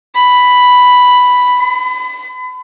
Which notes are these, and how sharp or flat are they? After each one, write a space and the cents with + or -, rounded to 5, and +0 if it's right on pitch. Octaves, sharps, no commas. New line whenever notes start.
B5 +5
B5 +40